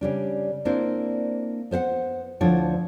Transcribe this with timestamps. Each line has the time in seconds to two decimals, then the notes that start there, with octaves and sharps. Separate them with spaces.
0.01 C#3 G3 D4
0.65 A#3 C4 D4 E4 C5
1.71 B3 C5 F5 F#5
2.41 D2 F3 D4 E4 C#5 F#5